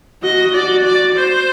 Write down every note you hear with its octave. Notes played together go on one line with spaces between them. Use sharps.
F#4 D#5
F#4 D5
D5
C5